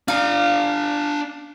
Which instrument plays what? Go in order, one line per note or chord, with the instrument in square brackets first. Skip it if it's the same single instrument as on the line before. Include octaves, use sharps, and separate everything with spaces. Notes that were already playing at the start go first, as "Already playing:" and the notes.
[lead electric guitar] D4 A#5 [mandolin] F5